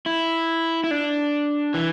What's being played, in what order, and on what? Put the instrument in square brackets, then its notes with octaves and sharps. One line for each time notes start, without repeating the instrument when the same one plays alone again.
[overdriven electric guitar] E4
E4
D4
E3